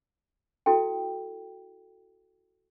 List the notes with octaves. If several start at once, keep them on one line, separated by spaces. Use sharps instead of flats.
E4 F#4 A4 G5